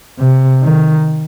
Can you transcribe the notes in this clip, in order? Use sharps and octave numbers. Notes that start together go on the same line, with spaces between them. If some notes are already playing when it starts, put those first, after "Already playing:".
C3
D#3